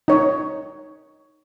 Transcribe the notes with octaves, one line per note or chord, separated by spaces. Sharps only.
D#4 C#5